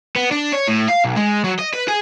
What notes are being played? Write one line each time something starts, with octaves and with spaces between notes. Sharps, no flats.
B3
D4
C#5
A2
F5
B1
G#3
F#3
D#5
B4
G#4